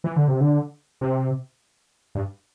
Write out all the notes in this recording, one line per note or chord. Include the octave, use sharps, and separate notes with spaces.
E3
D3
C3
D3
C3
G2